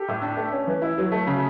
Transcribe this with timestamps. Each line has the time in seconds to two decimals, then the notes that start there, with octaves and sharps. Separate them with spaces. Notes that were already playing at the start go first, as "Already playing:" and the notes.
Already playing: G4 A4
0.08 A2
0.22 D4
0.37 A3
0.52 C#4
0.67 E3
0.82 E4
0.98 F#3
1.12 A3
1.27 C#3